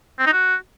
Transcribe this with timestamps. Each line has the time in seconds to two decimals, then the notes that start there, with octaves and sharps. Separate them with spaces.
0.19 C4
0.26 D#4
0.33 F#4